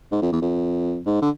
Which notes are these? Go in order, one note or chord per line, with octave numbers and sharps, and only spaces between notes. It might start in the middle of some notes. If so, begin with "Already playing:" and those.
G#2
F2
E2
F2
G#2
D3